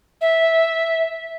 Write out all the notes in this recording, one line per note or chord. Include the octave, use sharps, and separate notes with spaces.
E5